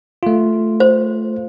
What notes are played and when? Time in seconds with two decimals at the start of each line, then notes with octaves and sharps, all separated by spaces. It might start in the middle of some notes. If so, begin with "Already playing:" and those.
0.23 A3 F4
0.80 C5